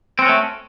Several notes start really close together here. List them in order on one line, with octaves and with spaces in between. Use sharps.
C4 F#4 C#4 A3